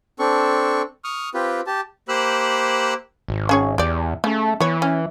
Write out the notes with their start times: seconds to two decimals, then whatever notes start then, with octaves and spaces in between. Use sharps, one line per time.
0.19 C4 D4 A4 C#6
1.04 C#6 D#6 F6
1.34 C4 F4 G4 B4
1.67 G4 A5
2.09 A#3 G4 C5 B5 E6 F#6
3.28 G#1
3.49 C#4 G#4 C#5
3.78 E2 G4 D5
4.24 C#3 A3
4.60 E3 B3 C#5
4.82 C#4